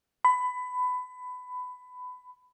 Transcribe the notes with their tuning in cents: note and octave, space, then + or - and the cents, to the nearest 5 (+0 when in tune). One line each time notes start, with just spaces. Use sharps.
B5 +20